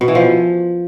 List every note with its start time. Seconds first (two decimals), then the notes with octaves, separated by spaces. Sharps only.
0.01 B2
0.08 E3
0.15 F3